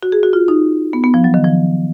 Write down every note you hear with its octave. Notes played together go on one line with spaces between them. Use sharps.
F#4
G#4
F#4
F4
D#4
B3
B3
F3
F#3
D#3
F3